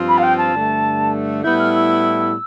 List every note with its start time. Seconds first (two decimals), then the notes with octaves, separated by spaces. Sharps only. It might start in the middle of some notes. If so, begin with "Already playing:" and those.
Already playing: G2 F3 C4 F4
0.08 B5
0.18 F5
0.23 G5
0.38 A5
0.53 G2 D3 A3
1.44 A2 G3 B3 E4 G6
1.59 F6
1.74 E6